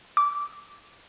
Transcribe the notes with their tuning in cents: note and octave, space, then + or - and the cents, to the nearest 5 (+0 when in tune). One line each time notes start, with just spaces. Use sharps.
D6 -15